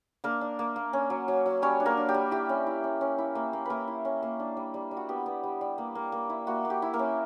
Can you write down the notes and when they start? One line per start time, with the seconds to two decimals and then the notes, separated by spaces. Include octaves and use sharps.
0.24 A#3 D4 A#4
0.41 D4
0.59 A#3
0.76 A#3
0.93 C#4
1.10 F#3
1.28 F#3
1.46 F#3
1.62 G3 C#4 C#5
1.80 D4
1.85 A#3 A#4
1.97 D4
2.09 G4
2.14 G3
2.31 E4 G4
2.49 C#4
2.66 E4
2.84 C#4
3.01 C#4
3.18 E4
3.35 A#3
3.53 A#3
3.65 A#3 E4 A#4 B4
3.88 E4
4.05 C#4
4.23 A#3
4.40 D4
4.57 G3
4.74 G3
4.91 G3
4.97 F#4
5.09 B3 G4
5.26 B3
5.43 G3
5.61 G3
5.78 A#3
5.95 A#3
6.12 A#3
6.30 E4
6.47 A#3 F#4
6.65 A#3
6.70 G4
6.82 E4
6.93 A#3 A#4
6.99 C#4